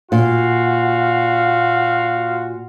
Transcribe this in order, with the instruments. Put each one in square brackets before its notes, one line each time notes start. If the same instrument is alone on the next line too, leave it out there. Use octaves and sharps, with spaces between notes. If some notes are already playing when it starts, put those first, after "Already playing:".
[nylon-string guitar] A#2 [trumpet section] F#4 F5 C6